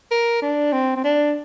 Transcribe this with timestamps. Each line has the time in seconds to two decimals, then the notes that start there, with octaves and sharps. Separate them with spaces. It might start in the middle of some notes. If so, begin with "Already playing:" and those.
0.11 A#4
0.42 D4
0.73 C4
0.96 C4
1.04 D4